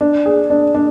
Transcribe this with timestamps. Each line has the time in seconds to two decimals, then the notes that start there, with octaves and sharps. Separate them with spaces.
0.01 D4
0.26 G#4
0.50 D4
0.75 D4